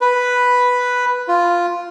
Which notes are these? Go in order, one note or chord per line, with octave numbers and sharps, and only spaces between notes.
B4
F4